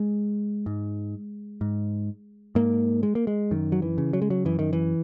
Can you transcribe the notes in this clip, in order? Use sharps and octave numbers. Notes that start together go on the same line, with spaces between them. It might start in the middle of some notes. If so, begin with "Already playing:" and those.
Already playing: G#3
G#2
G#2
G#2 A#3
G#3
A#3
G#3
F#2 D#3
F#3
E3
C#3
F#3
G#3
F#3
F#2 E3
D#3
E3